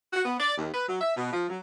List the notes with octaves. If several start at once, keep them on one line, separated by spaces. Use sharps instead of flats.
F#4
B3
D5
D#2
B4
F#3
E5
B2
F3
F#3